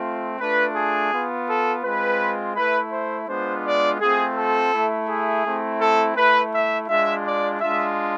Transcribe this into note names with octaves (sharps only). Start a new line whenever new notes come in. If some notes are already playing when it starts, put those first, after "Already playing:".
Already playing: A3 C4 F4
A3 D4 F4 B4
G#4
B3 F4
A4
G#3 C4 F4 B4
A3 E4 B4
C5
G#3 B3 D4 F4 C5
D5
A3 C4 F4 G#4
A4
A3 E4
G#4
A3 C4 E4
A4
A3 E4 B4
E5
G#3 D4 F4 E5
D5
G#3 D4 F4 E5